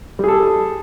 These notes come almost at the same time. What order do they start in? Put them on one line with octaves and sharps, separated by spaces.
G3 G#4 A4